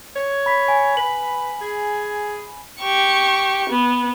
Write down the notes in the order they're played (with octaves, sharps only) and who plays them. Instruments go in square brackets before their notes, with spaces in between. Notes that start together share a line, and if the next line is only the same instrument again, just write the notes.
[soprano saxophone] C#5
[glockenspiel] B5 B6
G#5
[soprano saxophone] B4 [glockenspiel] F#7
[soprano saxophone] G#4
[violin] G4 C#6
B3